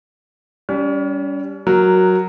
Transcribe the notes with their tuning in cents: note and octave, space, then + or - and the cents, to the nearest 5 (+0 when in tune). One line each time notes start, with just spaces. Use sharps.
G3 +0 C#4 +35
F#3 +0 A#4 +0